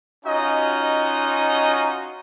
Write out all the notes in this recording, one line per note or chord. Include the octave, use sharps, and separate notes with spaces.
C#4 D#4 F4 F#4 D#5